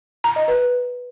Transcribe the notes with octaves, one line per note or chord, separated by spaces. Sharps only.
A#5
D#5
B4